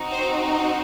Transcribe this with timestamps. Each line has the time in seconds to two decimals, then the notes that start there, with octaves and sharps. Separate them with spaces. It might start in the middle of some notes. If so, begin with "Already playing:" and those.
Already playing: C4 D#4 F#4
0.12 C5
0.50 C5